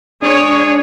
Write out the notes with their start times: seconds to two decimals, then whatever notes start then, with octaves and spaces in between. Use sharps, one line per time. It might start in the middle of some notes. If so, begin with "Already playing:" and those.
0.22 G#3 D4 G#4 C#5